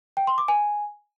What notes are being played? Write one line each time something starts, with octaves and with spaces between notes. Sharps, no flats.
G5
C6
D6
G#5